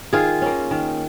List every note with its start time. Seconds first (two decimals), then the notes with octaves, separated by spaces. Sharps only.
0.13 D#3 F4 G#4
0.42 A#3 C#4
0.71 D#3